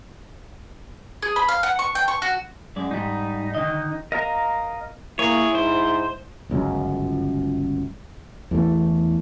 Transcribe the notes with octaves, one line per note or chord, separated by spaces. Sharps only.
G#4
B5
F5
F#5
C#6
G5
C#6
F#4
F#2 G#3 D5
G#2 G3 D#4
D3 D#3 D#5
A#4 D#5 F5 A#5
A#3 E4 G#4 C#5
G#2 C5
G1 C#2 F#2
E2 E3 A3